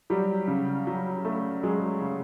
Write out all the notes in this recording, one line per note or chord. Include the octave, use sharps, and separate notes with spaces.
F#3 G3 G4
C#3
F#3
A3
F#3 G#3 G#4
C#3